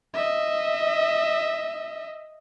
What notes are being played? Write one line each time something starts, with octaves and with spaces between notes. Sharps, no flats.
D#5 E5